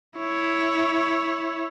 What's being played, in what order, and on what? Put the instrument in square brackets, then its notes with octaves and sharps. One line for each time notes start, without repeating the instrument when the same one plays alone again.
[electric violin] E4 C#5